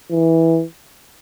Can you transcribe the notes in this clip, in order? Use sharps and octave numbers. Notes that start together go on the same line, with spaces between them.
E3